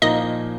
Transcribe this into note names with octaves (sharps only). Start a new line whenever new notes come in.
A#2 F3 A#3 D#4 D#5